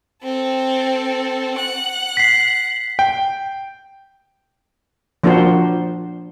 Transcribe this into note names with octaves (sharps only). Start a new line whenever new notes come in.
C4 A4
F#5 F#6
B6 C7
G5
F3 A#3 D4 F4 F#4 C5